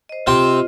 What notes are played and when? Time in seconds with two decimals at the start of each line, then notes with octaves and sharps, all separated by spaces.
0.09 C5 D#5
0.26 C3 C4 F4
0.44 C5 D#5